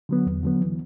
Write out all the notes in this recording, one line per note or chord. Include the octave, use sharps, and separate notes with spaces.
D3 F#3 B3
E2
D3 F#3 B3
E3